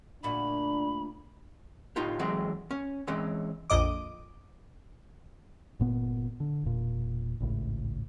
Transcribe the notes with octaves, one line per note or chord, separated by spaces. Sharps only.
D2 A#2 D4 F#4 B5
A2 D#4 F4 G4
E3 F#3 G#3 A3 C4
C#4
E3 G#3 C4 C#4
A#1 F2 D#5 D6
G1 A#2 B3
D3
E1 A#2
G#1 C#2 A2